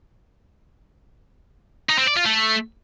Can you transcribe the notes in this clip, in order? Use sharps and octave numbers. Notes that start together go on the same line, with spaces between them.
D#4
C4
D5
F4
A3